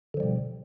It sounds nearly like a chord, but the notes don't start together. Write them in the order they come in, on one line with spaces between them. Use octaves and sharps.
D3 F3 G3 B2